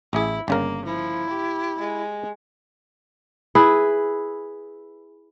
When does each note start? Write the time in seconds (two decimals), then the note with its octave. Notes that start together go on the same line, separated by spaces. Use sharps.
0.13 A1 E4 G#4
0.48 G1 C#3 A#3 A#4
0.85 F3 E4
1.30 G4
1.79 G#3
3.55 E4 G#4 B4